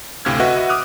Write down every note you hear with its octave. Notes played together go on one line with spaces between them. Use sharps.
D2 A2 C3 F5 F6 G#6
F#4 B4 D#5 E5 F#5
D6 D#6 F6 F#6